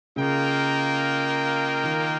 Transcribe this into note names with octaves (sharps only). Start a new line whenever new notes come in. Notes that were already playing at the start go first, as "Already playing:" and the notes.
C#3 A#3 F4 A#4 D#5 G5
D#3